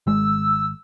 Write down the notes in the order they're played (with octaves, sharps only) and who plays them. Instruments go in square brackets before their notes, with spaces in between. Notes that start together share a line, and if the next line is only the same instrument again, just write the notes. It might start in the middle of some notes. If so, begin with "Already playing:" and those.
[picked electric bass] G#1 G#3 [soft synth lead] E6